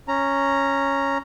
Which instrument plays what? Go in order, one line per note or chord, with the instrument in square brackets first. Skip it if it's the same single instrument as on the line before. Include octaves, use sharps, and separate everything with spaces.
[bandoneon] C#4 A#5